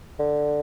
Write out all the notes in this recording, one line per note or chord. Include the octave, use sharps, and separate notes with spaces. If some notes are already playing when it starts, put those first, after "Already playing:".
D3